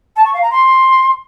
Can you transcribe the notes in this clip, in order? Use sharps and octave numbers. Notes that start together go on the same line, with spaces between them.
A5
C#6
F5
A#5
C6